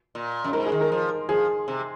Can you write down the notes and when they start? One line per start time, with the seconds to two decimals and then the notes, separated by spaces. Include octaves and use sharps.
0.15 A#2
0.44 F#2
0.53 G#2 A#4
0.66 G#4
0.72 D#3
0.81 A#4
0.92 F3
1.29 F3 G#4
1.68 C3